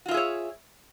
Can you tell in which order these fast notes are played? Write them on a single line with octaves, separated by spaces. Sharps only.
F#4 F4 E5 G#4 C#5